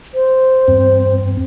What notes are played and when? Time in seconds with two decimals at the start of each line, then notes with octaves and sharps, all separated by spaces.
0.14 C5
0.68 E2 G2 C4